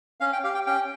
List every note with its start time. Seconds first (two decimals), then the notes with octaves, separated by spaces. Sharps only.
0.20 C#4 F5
0.33 G5
0.44 G4 F5
0.54 G5
0.66 C#4 G5